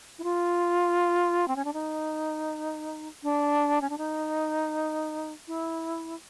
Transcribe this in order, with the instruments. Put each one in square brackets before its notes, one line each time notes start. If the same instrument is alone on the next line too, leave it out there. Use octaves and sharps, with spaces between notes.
[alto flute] E4
F4
C4
C#4
D4
D#4
D4
C#4
D4
D#4
E4